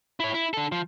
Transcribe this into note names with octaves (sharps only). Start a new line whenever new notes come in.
E4 C#5
E4
D3 A4
F3